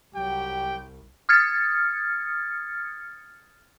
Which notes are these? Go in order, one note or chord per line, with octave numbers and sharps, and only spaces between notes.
C2 F#3 G4 G5
D#6 F6 G#6 A6 C#7